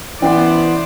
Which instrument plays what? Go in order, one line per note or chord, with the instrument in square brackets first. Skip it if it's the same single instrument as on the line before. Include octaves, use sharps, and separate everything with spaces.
[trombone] E3 [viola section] B3 C5 D5 [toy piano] C#4 F#5